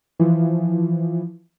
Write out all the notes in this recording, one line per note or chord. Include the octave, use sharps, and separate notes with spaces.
E3 F3